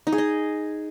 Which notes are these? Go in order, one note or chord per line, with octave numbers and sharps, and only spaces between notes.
D#4
G#4
D#5